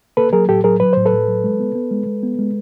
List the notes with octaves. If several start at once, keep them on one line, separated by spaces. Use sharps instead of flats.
A#3 A4 B4
F#3 G#4 A#4
A2 G4 A4
F#3 G#4 A#4
F#3 B4
A2 C5
A4 B4
A2
F#3
G#3
B3
B3
G#3
G#3
B3
G#3